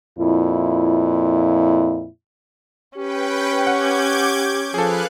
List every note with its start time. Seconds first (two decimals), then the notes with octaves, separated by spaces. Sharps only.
0.19 F2 A#2 E4
2.98 C#4 G4 B4 G5
3.67 F#5 D6 G6 G#6
4.74 F3 G#4 A4 B4 F5 F#6